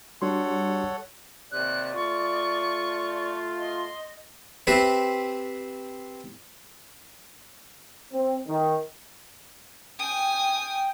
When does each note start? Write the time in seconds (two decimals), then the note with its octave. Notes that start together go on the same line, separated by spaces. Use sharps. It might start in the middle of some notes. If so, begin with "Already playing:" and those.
0.22 G3 D4 F#4 A4 C#5 F#5 C6
1.52 D#2 C3 D5 F#6
1.95 A3 F4 C#6
3.59 D#5 C6
4.67 C4 G4 B4 C5 E5
8.12 C4
8.48 D#3
10.00 G5 G#5 D#6